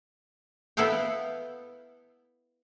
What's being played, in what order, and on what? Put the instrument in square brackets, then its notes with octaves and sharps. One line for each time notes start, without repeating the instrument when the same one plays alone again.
[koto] B3 E4 A4 F5 G5